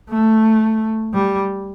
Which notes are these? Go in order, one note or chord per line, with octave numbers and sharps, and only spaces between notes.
A3
G3